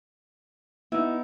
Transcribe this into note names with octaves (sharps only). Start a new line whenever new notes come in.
B3 D#4 E4